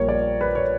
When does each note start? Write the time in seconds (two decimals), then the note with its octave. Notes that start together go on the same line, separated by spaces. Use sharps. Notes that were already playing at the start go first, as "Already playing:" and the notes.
Already playing: A#1 A#2 G3 A#4 C#5
0.09 D5
0.41 B4
0.55 C#5